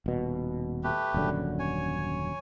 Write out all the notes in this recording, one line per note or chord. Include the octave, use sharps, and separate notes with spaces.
D#1 B2
A3 G4 B4
D#1 F#2 D3
C#5 G#5